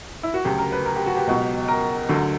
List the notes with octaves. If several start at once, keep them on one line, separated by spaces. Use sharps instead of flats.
E4
F#4
D2 C#3 F#3 G4
A#4
B4
A#4
G4
F#4
G4
C#2 B2 F#3
A#4
D2 D3 F#3